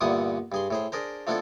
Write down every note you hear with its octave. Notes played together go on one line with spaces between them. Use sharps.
G2 A#2 D3 B3 E4 D#6
G2 G#4 C6
A2 G#4 C5
D4 G#4 A#4 C5
F3 A3 B3 D4 E4 A4